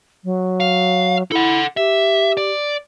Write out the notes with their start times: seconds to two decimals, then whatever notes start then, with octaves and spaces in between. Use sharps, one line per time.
0.24 F#3
0.60 F5
1.32 E4 A4 F#5
1.77 G4 E5
2.37 D5